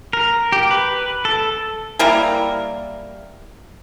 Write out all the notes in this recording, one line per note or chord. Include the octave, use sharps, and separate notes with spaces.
A#4
G4
B4
A4
G3 A#3 E4 A#4